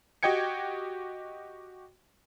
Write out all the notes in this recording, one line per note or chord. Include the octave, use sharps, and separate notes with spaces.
F#4 G4 D#5 G5 G#6 C#7